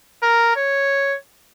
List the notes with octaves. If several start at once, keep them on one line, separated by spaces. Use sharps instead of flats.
A#4
C#5